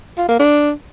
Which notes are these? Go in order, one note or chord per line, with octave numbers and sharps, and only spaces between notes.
F4
A#3
D4